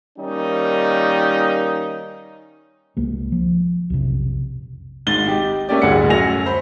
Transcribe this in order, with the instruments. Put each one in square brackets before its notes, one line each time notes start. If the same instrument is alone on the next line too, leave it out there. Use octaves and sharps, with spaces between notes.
[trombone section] D#3 G3 A#3 C#4 D#4
[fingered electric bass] C2 G#3 A#3
F3
B1 F2 C3
[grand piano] G#1 G#2 A6 G7
D#4 G4
A3 A#3 C#4 G4 D5
D1 D2 G2 G#4 F#5 C#7
F#2 F#3 A3 G#5 A#6 F7
C5 B5